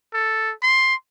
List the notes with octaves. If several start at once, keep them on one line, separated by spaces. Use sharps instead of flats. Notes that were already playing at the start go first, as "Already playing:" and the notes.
A4
C6